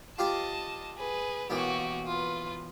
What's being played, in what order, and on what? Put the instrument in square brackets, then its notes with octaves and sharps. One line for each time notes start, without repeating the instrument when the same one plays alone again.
[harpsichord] F4 G4 C5 [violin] D#5 A5
[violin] G#4 B4
[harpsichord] B1 E3 A#3 [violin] F#4 G4
[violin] F4 B4